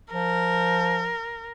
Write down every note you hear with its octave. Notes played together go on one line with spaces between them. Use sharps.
F3 A#4